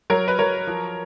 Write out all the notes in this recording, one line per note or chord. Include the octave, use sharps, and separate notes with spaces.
F#3 A#4 C#5
B4
F#3 A#4 C#5
F3